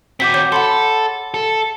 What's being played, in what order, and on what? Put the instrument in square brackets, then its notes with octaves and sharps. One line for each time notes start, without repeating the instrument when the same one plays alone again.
[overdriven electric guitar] C4 F#4 [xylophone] D6 G6 B6
[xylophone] C#5 G6
[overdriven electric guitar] A4 [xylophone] F#5 B5 C6
[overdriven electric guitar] A4